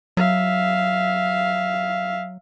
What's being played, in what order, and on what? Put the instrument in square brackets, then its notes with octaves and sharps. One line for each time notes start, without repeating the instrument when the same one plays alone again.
[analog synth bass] F#3 [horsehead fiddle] E5 F5